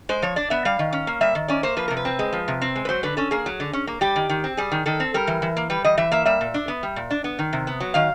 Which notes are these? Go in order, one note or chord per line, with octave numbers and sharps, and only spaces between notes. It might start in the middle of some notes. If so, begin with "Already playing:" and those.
G#3 C5
F3 C#5
D4 D5
B3 E5
G3 F5
D#3
C#4
A#3
G3 E5
D#3
C#4 D5
A#3 C5
F3 B4
C3 A#4
B4
C4
G#3
F3
C3
C4
G#3
B4
F#3 C5
D3 B4
C#4 A4
A#3 G#4
F#3
D3
C#4
A#3
G3 G4
D#3
D#3
C4
G3 G#4
D#3
D#3 A4
C4
G3 A#4
E3
E3
A#3
G3 B4
E3 D#5
E3 E5
A#3 E5
G3 E5
A#2
D4
B3
G3
A#2
D4
B3
D#3
C3
B3
F#3
D#3 F5